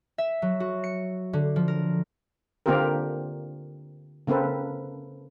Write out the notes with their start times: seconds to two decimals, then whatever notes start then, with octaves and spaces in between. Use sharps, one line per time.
0.18 E5
0.42 F#3
0.60 F#4
0.84 C#7
1.33 D3
1.56 F3
1.68 A#4
2.66 D3 A#3 C4 F4 G4 A#4
4.27 C#3 A#3 C4 A4 B4